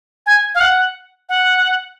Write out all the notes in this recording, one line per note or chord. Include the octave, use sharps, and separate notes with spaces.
G#5
F5
F#5
F#5